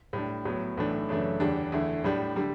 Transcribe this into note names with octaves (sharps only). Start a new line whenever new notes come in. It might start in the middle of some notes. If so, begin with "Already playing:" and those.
A2 G3 D4
A2 F#3 B3
B1 A2 E3 A3 D4
F#2 C#3 E3 A3 D4
E2 D3 G3 D4
E2 D3 A3 E4
A2 G3 D4
D3 G3